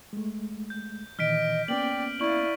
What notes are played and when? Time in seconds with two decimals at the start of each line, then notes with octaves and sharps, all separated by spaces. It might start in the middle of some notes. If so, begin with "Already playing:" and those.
0.13 G#3 A3
0.70 G6
1.19 A#2 D#3 E3 D#5 F6 B6 D7
1.68 A#3 B3 C#4 D5 G5 F#7
2.20 E4 D5 F5 C#6 F#7